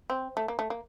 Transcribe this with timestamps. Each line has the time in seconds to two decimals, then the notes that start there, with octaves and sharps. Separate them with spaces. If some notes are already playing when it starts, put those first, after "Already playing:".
0.10 C4
0.37 A3
0.48 A#3
0.59 A3
0.70 A#3